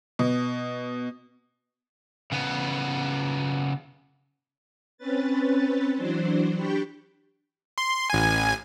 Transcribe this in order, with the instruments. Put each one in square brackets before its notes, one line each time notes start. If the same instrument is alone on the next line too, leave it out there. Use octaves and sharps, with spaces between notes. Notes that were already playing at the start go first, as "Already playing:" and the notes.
[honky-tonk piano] B2
[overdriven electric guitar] C#3 B3
[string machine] C4 C#4 B4 A6
E3 F#3 D4 C5
D4 G4 G5 B5 C#6
[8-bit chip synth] C6
A1 G#5